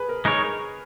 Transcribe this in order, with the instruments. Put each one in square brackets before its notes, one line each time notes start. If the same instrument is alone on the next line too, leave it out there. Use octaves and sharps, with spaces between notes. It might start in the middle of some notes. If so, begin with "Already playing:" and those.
Already playing: [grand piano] G#4 B4
A#4
[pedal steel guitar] G#3 D#4 A#4 C#5 [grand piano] G#4